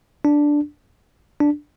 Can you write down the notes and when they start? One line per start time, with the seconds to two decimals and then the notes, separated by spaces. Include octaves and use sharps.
0.25 D4
1.40 D4